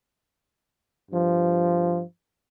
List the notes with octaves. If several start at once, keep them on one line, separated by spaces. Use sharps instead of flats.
G2 F3